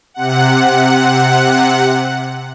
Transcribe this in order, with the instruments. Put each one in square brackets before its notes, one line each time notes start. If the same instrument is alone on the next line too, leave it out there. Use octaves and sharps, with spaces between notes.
[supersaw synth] C3 F#5